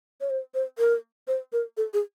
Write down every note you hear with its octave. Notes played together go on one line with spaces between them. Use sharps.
C#5
C5
C5
A#4
C5
A#4
A4
G#4